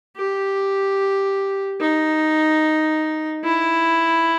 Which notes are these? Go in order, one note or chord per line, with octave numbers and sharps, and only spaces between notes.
G4
D#4
E4